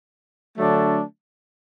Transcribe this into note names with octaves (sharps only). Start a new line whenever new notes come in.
D3 F#3 A3 D4